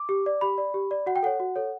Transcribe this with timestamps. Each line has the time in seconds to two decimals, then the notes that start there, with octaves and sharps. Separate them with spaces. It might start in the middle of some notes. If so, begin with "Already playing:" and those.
Already playing: D6
0.09 G4
0.26 D5
0.41 G4 B5
0.58 D5
0.74 G4
0.91 D5
1.06 F#4 F#5
1.16 G5
1.23 A4 C#5 F#5
1.40 F#4
1.56 A4 C#5